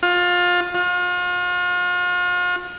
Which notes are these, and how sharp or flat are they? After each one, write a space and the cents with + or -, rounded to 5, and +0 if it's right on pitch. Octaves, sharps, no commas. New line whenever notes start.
F4 +25
F4 +40